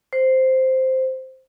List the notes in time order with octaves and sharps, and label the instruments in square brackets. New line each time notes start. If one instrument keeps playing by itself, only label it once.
[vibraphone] C5